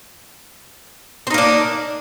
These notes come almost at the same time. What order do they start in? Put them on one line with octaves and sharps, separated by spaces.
C4 D#4 A#3 D4